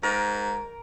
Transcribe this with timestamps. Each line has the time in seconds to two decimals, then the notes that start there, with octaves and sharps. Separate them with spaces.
0.03 G#2 A#4